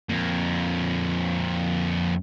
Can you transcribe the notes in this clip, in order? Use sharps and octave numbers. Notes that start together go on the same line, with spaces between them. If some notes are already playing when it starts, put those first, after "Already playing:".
F2 A#3